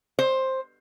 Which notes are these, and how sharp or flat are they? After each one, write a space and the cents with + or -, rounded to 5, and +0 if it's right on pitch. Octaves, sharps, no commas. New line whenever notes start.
C5 +10